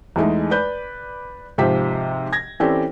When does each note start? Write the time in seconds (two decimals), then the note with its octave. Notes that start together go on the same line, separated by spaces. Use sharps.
0.16 E2 G#3 A3 D#4
0.51 B4 D5 G6
1.58 G#2 C3 F3 G4 C5 B6
2.33 G#6 A#6
2.60 E3 C4 C#4 G4 A4 D5